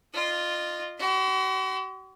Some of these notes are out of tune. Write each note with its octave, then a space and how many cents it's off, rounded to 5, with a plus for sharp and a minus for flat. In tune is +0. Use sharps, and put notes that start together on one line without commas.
F4 +0 D#5 -30
F#4 +40 C6 -40